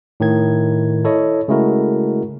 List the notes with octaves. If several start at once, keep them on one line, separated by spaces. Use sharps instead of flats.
A2 D#3 G#6
E4 A4 C#5 D#5
C#3 G#3 A3 E4 F#4 A#4